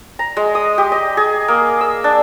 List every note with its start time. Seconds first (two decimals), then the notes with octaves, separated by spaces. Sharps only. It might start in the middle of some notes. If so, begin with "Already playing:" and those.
0.19 A#5
0.37 G#3
0.55 D#6
0.78 G4
0.92 D#5
1.17 G#4
1.48 A#3
1.81 E6
2.04 D4